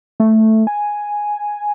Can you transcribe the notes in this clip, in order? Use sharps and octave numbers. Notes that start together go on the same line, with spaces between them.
A3
G#5